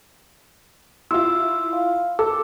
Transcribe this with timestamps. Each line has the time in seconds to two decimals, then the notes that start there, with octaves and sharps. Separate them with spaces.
1.11 E4 F4 C6 E6
1.73 F5
2.19 A4 D6 E6